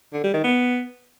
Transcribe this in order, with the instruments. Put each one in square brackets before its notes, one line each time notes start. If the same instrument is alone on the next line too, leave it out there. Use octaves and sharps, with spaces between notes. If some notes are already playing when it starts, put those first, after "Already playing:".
[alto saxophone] D3
G3
D#3
B3